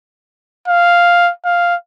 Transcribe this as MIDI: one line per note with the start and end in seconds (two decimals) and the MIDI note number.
0.68 1.31 77
1.45 1.75 77